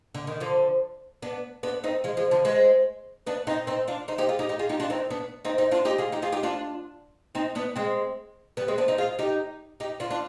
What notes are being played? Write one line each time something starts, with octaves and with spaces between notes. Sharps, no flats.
D3
D#3
D3 F3
B3 D4
B3 D4
C4 D#4
F3 G#3
F3 G#3
D3 F3
G#3 C4
B3 D4
C4 D#4
C4 D#4
D4 F4
C4 D#4
D#4 G4
F4 G#4
D#4 G4
D#4 G4
F4 G#4
D#4 G4
D4 F4
C4 D#4
B3 D4
C4 D#4
C4 D#4
D4 F4
D#4 G4
F4 G#4
D#4 G4
F4 G#4
D#4 G4
D4 F4
C4 D#4
B3 D4
G#3 C4
G3 B3
G#3 C4
B3 D4
C4 D#4
F4 G#4
D#4 G4
D#4 G4
D4 F4
D4 F4